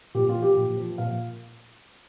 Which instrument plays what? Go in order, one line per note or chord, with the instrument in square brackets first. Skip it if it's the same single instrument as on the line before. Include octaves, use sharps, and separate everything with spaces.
[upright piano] A#2 G4
F4
F3
G4
A#2
F3
A#2 F5